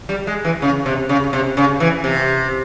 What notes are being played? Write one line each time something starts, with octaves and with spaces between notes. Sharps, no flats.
G3
G#3
E3
C#3
C3
C#3
C3
C#3
E3
C3